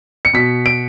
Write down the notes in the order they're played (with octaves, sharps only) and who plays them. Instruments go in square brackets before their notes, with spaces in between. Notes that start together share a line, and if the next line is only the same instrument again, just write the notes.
[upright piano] C#7
B2 B6
D7